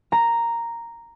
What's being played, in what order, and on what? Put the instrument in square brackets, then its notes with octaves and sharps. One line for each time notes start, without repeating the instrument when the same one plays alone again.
[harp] A#5